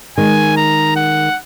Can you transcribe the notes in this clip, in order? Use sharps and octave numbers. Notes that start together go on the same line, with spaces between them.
D#3 G#3 G#5
A#5
F#5